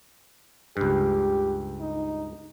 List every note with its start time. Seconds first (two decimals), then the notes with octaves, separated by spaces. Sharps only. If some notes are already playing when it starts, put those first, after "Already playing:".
0.77 C#2 G2 G4
1.80 D#4